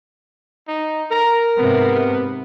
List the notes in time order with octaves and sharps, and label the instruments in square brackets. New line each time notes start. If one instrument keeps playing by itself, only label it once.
[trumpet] D#4
[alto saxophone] A#4 [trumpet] A#5
[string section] G#2 C3 [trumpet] B3